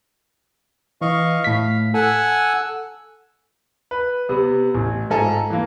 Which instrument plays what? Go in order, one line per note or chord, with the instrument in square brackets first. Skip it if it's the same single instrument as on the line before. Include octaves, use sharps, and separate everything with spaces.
[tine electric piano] E3 [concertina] D#5 F5 C#6
[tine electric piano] A2 B6 [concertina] F5
[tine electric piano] A4 [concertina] F#5 G#5 E6
[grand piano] B4
C3 B3
A1
G#2 F4 A4 G#5 A#5
E3 A#3